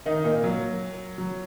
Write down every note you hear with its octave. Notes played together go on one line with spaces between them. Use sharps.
D#3 D#4
A#2 A#3
F#3
F#3